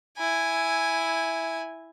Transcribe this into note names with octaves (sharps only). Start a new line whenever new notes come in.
E4 G#5